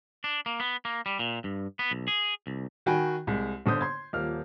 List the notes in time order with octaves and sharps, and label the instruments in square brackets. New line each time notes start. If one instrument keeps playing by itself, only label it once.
[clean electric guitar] D4
A#3
B3
A#3
G3
A#2
G2
B3
B1
G#4
C2
[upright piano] D#3 F#4 G5 G#5 B5
C2 G#3
G1 D3 C5 D#6 G6
C6 G#6
D#1 F3 A#3 F6